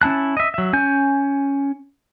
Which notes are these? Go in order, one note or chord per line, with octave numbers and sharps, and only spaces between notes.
C#4 E4 A5 F#6
D#5 E5
F#3 E5
C#4 G#5 G6